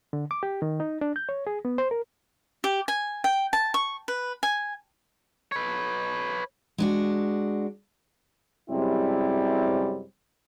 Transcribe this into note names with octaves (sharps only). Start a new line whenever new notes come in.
D3
D6
G4
D#3
D#4
D4
G6
C#5
G#4
B3
C5
A#4
G4
G#5
G5
A5
C#6
B4
G#5
B4 C#5
G#3 D4 F#4
F#2 C3 G3 G#3 C4 E4